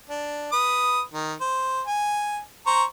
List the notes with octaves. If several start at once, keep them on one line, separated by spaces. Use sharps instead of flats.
D4
B4 D#6
D#3
C5
G#5
C5 A#5 C#6